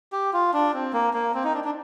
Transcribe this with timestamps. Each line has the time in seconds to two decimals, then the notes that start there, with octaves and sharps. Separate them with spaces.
0.12 G4
0.33 F4
0.54 D4
0.74 C4
0.93 A#3
1.14 A#3
1.34 C4
1.44 D#4
1.54 D4
1.64 D4